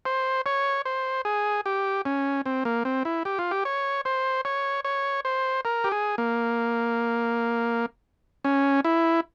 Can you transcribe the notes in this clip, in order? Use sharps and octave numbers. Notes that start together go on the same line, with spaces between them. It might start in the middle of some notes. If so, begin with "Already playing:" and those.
C5
C#5
C5
G#4
G4
C#4
C4
A#3
C4
E4
G4
F4
G4
C#5
C5
C#5
C#5
C5
A#4
G4
G#4
A#3
C#4
E4